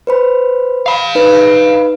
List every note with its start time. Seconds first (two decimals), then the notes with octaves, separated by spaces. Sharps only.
0.07 B4 C5 B5
0.86 F5 B5
1.15 D#4 B4